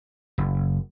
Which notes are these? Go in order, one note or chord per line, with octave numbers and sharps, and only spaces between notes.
F#1